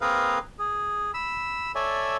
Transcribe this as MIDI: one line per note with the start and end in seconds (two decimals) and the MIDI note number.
0.01 0.39 58
0.01 0.39 60
0.01 0.39 68
0.01 0.39 70
0.01 0.39 71
0.01 0.39 77
0.59 1.11 68
1.14 1.72 83
1.14 1.72 88
1.75 2.17 69
1.75 2.17 73
1.75 2.17 74
1.75 2.17 76
1.75 2.17 80